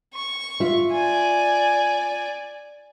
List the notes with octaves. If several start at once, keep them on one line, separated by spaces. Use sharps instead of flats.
C#6
F4 E5
D5 G#5